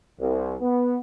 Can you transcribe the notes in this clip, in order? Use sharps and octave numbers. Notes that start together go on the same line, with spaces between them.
C2
B3